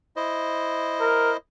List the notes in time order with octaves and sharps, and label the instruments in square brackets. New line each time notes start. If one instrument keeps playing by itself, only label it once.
[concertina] E4 C5 D#5
[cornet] A#4